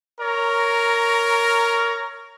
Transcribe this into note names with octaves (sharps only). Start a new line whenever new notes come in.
A#4 C#5 A#5